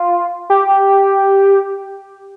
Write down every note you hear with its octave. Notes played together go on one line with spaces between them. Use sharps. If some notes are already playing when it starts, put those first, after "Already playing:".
Already playing: F4
G4